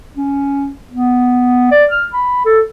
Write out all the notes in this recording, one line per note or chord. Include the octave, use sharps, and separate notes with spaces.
C#4
B3
D5
F6
B5
A4